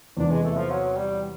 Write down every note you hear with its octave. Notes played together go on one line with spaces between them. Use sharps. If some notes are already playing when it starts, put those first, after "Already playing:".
E2 C3 E3 D4
G#3
A3
F3
F#3
G3